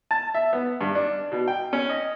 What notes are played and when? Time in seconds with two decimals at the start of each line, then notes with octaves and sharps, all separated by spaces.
0.11 A5
0.35 E5
0.53 B3
0.81 G2
0.95 D4
1.32 B2
1.48 G5
1.73 C#4
1.90 D#5